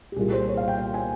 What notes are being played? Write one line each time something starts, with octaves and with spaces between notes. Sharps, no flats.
G4
C2 A#2 G3 A#3 F4 G#4
C5
C#5
F5
G5
G5
G#5